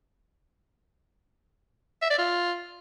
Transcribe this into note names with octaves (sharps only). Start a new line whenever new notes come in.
E5
D5
F4